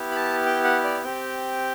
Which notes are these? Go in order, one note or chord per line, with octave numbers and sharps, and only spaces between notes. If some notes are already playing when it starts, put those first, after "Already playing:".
Already playing: B3 E4 G4
B5
A5
G5
F#5
D5
C4 G4 G5